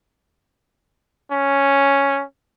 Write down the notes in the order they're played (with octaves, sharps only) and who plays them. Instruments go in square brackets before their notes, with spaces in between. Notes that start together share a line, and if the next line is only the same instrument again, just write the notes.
[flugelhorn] C#4